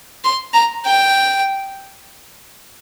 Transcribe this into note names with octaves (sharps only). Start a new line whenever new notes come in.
C6
A#5
G5